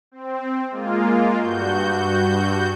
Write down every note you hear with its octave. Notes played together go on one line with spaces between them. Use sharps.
C4
G#3 A#3 F4
G2 F#4 G6